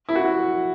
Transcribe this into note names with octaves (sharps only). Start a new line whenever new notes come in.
E4
F#4